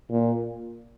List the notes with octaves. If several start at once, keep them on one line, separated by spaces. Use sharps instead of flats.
A#2